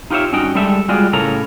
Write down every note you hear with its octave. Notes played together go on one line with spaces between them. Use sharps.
D#4 F4 G4 B4 C#5 E5
G2 C#4 D#4 F#4 G5
G3 G#3 G4 A4 E5
G3 G#3 F4 F#4 G#4 D5
A2 C#3 A4 A#4 C#5 A#5